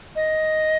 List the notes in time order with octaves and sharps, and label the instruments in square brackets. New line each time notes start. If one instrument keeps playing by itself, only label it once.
[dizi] D#5